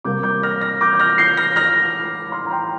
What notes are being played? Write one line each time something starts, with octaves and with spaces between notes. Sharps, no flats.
C3 G3 A#3 D6 G6
D6 G6
F6 A#6
F6 A#6
D6 G6
G6
F6 A#6
G6 C7
F6 A#6
F6 A#6
C6 F6
A#5
G5 C6